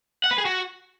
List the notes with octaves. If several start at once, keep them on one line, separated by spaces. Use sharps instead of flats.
F#5
B4
G#4
F#4